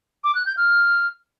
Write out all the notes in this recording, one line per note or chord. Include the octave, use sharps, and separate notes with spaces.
D6
F#6
G6
F6